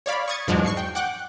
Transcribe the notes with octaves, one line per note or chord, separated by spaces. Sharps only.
C#5 D5 F5 B5
C#6 D#6 G#6 A6 C#7
E2 G#2 F3 F#3 G#3 D4
C#6 C7 C#7
G5
F#5 G5 D6 F#6